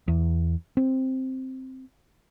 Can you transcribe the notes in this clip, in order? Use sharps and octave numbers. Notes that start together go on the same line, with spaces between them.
E2
C4